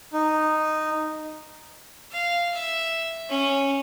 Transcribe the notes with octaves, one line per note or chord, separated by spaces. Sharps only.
D#4
F5
E5
C#4